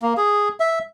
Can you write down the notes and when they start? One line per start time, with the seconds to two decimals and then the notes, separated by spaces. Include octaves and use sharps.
0.02 A#3
0.17 G#4
0.60 E5